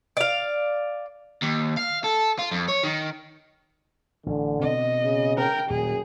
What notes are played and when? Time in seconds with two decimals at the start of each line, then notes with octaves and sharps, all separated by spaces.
0.17 D5 F5
1.42 D#2
1.77 F5
2.04 A4
2.39 F4
2.51 F2
2.68 C#5
2.83 D#3
4.26 A1 D3
4.62 B2 C4 D#5
5.04 C#3
5.37 A#4 G5
5.70 D#1 F#2 G#4